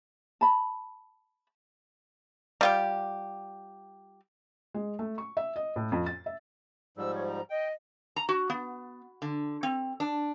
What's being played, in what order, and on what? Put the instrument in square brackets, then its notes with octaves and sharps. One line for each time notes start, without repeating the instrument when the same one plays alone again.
[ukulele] A5 B5
[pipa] G3 F4 G4
[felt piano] G#3
A3
C#6
E5
D#5
A2
F2
A6
E5
[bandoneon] G#2 F3 G3 [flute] E6
[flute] C#5
A#5
[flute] D#5 [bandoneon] G5
[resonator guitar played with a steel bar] A#5
F#4
B3
D3
C4
D4